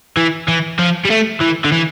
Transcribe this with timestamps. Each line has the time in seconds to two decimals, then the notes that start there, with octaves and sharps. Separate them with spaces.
0.17 E3
0.48 E3
0.79 F3
1.05 G3
1.10 A3
1.40 E3
1.64 D3
1.72 E3